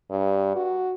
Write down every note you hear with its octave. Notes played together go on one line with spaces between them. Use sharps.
G2
F#4